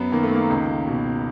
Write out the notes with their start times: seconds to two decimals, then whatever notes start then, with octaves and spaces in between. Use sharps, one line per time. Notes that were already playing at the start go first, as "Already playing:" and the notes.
Already playing: F#2 B3
0.12 D#3 A#3
0.23 A3
0.34 A#3
0.50 C#2
0.87 B2